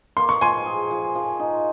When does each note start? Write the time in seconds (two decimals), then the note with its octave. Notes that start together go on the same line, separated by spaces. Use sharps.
0.17 A#3 C6
0.29 C#6
0.41 F3 G#5 C6
0.66 G#4
0.91 F3
1.15 F3
1.39 D#4